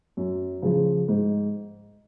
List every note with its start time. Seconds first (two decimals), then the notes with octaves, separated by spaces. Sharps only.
0.17 F#2
0.62 C#3 F3
1.08 G#2